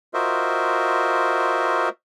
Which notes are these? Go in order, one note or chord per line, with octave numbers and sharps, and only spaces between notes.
F4 F#4 A#4 C5 D#5 E5